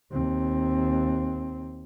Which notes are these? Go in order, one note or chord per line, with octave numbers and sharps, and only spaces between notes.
D#2 C4